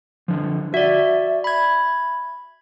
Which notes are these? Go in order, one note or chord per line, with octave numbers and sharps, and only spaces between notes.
D3 F3
F#4 D5 E5
B5 G#6